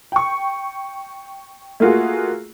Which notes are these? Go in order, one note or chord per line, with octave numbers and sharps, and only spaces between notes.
G5 C#6
A3 A#3 F4 F#4 G#4